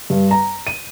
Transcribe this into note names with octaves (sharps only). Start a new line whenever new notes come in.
G2
A#5
D#7